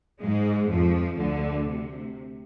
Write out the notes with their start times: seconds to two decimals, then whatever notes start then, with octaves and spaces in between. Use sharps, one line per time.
0.21 G#2 G#3
0.71 F2 F3
1.20 D2 D3
1.71 C3